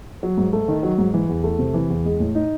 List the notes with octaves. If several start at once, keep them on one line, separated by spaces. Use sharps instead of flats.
F#3
G#2
A3
D#3
F#3
G#2
E3
E2
A3
C3
E3
E2
G#3
A2
D#4